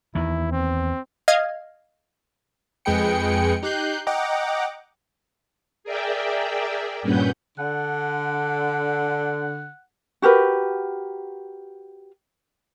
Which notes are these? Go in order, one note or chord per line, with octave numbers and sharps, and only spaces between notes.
E2 D#3 E4
C4
D#5 F5 F6 G#6
F2 G#3 G#4 B4 G5 C#7
D#4 G4 F#6 G6 C7
D#5 F#5 G5 A#5 D6
G#4 A#4 D5 E5 G5
G2 A#2 C#4 B4 F#5 G6
D3 F#5
F#4 G4 A#4 B4